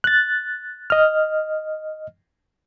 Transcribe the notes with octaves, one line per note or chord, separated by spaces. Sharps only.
F#6 A6
D#5 F6